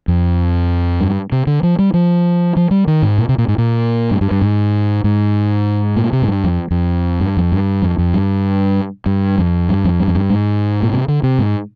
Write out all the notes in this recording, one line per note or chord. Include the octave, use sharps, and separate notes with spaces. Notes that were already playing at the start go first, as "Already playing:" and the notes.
F2
G2
C3
D3
F3
G3
F3
F3
G3
D#3
G#2
A#2
C3
A#2
G#2
A#2
G2
G2
G2
G#2
G#2
A#2
C3
G#2
G2
F2
F2
G2
F2
G2
F2
F2
G2
G2
F2
G2
F2
G2
F2
G2
G#2
A#2
C3
D3
C3
G#2